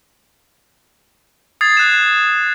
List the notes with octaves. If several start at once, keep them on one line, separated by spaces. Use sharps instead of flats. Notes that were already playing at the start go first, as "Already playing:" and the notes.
D#6 G#6 A6 C7
F#6 E7